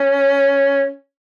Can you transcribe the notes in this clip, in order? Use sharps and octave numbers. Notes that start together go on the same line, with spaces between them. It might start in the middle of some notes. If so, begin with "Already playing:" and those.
Already playing: C#4